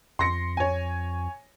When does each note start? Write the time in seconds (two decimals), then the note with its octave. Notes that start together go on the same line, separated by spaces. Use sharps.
0.19 F2 C6 A#6 C#7
0.57 C#5 G#5